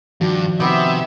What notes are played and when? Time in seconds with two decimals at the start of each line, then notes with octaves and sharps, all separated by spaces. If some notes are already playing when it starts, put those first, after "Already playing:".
0.21 G2 D#3 F3 F#4
0.60 C3 B3 D#4 G4 E5